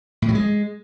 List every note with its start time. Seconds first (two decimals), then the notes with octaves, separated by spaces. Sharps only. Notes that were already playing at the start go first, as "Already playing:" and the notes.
0.22 A2
0.28 F#3
0.35 G#3